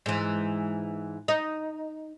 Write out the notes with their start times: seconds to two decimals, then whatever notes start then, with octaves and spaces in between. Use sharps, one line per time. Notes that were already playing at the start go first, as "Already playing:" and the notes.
0.06 G#2 E3
1.28 D#4